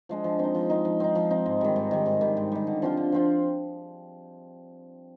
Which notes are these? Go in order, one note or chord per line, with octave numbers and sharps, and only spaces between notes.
F3 G#3 D4
F3
C4 D#4
F3
C4 D#4
F3
C4 D#4
F3
C4 D#4
G#2
D#3 G3
G#2
D#3 G3
G#2
D#3 G3
G#2
D#3 G3
D3
F3 C4 F4
D3
F3 C4 F4